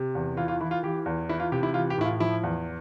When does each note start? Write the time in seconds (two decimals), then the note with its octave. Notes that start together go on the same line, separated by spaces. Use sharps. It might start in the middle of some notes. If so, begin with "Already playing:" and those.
Already playing: C3
0.15 E2
0.37 E3 F4
0.48 F4
0.61 E3 E4
0.71 F4
0.83 E3 G4
1.06 E2
1.29 E3 E4
1.40 F4
1.52 C3 G4
1.63 E4
1.74 E3 F4
1.90 G4
1.98 A2 E4
2.05 F4
2.20 F3 E4
2.43 E2